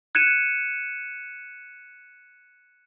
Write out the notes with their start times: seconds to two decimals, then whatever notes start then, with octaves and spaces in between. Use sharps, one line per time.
0.15 F#6 G#6 C#7 D#7 E7